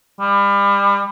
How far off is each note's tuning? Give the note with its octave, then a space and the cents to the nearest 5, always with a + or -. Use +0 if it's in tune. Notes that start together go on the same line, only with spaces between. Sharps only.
G3 +35